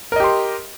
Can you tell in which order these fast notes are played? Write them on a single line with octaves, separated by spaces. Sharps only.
A#4 D#5 G4 C6